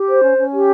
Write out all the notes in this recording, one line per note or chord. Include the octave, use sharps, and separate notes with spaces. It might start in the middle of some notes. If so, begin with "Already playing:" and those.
Already playing: G4
C5
C#4
C#4
G4